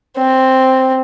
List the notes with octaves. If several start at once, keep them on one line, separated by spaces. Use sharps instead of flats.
C4